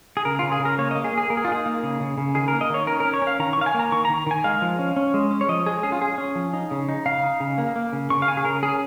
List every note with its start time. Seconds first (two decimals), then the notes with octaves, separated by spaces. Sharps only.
0.17 G#4
0.25 C#3 A#4
0.39 C#3 F4
0.52 G#4
0.60 C#3
0.65 A#4
0.78 A#3 C#5
0.91 D#5
0.95 A#3
1.04 G#4
1.12 A#3
1.18 G#4
1.30 A#3 A#4
1.37 G#4
1.45 F4
1.47 D#4 G#4
1.66 A#3
1.83 C#3
2.00 C#3
2.18 C#3
2.34 D#3 G#4
2.48 A#4
2.53 A#3
2.61 D#5
2.70 D#3 C#5
2.87 C#4 A#4
3.00 A#4
3.05 C#4
3.14 C#5
3.22 C#4
3.27 F5
3.39 D#3 A#5
3.53 C#6
3.57 D#3 F5
3.66 G#5
3.74 A#3 A#5
3.92 D#3 C#6
4.05 A#5
4.09 D#3
4.26 D#3 G#5
4.44 G#3 F5
4.62 F3
4.79 C#4
4.96 C#4
5.14 G#3
5.31 C#4
5.41 C#5
5.49 F3 D#5
5.66 G#3 G#4
5.83 C#4 G#4
5.92 F4
6.01 C#4 G#4
6.18 C#4
6.35 F3
6.53 D#4
6.71 C#3
6.89 D#4
7.06 C#3 F5
7.23 D#4
7.40 C#3
7.58 A#3
7.76 A#3
7.93 C#3
8.10 C#3 C#6
8.22 F5
8.28 C#3 G#5
8.37 G#4
8.45 C#3 A#4
8.63 C#4 G#4